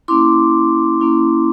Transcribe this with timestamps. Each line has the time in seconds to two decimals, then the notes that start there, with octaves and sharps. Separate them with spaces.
0.08 A#3 C#4 E4 C6 D6
1.01 A#3 C#4 E4